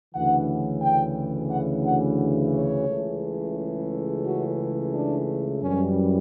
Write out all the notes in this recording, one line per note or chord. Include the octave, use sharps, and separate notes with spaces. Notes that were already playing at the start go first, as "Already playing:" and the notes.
D2 C#3 E3 F#5
G5
F#5
F#5
C#5
C#2 C#3 E3 A3
F#4
D4
F#2 E3 G3 C#4